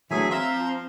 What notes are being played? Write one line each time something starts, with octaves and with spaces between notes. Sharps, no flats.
D2 E3 F#3 A3 D4 G#4 E5 G#5
C4 E5 F5 A#5 C6
F3